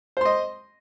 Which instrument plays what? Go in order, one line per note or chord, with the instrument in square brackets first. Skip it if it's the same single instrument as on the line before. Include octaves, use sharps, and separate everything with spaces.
[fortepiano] C5
C6
D#5